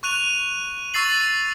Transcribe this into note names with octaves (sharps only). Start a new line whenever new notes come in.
C#6 F#6 D#7 F7
C#6 E6 A6 C7 F#7